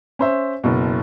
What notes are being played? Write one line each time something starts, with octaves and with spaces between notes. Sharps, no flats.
C#4 C5 E5
F#1 B2